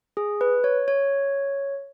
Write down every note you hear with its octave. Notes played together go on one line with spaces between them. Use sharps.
G#4
B4
C#5
C#5